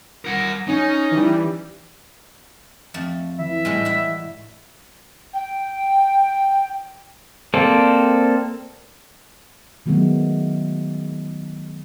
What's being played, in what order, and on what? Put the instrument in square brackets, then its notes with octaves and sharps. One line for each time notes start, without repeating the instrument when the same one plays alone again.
[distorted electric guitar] A#4 F#5
[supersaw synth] C#4 [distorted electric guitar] D#4
[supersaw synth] E3 G3
[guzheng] F2 A3
[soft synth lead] E3 [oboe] E5
[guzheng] A2 G3 G#3
E4 F#4
[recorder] G5
[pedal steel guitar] A#3 C4 A4 C5 D5
[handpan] D#3 F#3 G#3 A3 B3